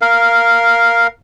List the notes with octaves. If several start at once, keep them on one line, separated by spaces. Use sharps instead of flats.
A#4 F5